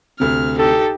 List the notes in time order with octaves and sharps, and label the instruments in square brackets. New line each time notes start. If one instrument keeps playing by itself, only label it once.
[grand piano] D2 C3 [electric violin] F6
[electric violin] D#4 G4 [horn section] A4